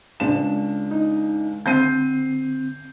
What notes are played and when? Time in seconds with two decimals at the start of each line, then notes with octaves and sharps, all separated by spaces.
0.20 C#2 D4 E7
0.91 D#4
1.66 D3 C4 G6 C7 D#7